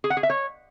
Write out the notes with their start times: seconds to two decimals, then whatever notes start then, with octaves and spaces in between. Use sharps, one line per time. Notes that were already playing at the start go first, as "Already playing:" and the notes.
0.04 G#4
0.10 F#5
0.17 G#4
0.23 E5
0.30 C#5